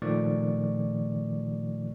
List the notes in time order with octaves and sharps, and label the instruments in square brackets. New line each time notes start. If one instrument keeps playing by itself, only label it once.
[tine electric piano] A#2 D#3 F3 A3 D5 C#6